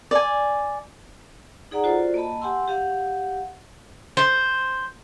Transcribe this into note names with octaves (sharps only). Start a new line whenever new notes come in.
D5 G#5
D#4 G#4 D5 F#5 A#5
F4 F#4 A4 C5 D5
A#3 D#5 A5 B5
G4 F#5 G#5 C6 E6
G4 F5 F#5
C5